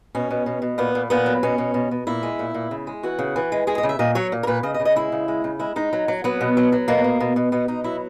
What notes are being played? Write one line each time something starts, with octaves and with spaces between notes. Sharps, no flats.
B2 C#4
B2
B2
B2
A#2 B3
A#2
A#2 B3
F#3
B2 C#4
B2
B2
B2
A#2 E4
G#3
A#2
A#2
C#3
G#3
E3 F#4
C#3
E3
G#3
G#3 G#4
D#5
C#3
E5
A#2 D#5
F#3 C#5
A#2
A#4
A#2 B4
C#3 D#5
D#5
C#3
D#5
G#3 E4
C#3
G#3
C#3
G#3 E4
G#3 D#4
F#3
F#3
F#3 B3
B2
F#3
F#3
B2 A#3
B2
B2
B2
B2 B3
B2 D#4
F#3 E4